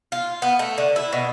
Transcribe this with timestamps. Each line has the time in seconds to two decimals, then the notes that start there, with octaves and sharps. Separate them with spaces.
0.12 F4
0.42 B3
0.59 A3
0.78 D3
0.96 E4
1.13 B2